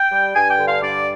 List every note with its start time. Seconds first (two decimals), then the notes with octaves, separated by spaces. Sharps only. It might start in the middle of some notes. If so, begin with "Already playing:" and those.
Already playing: G5
0.11 G3
0.34 G2 G#5
0.50 G5
0.58 D3
0.66 F5
0.82 G2 D5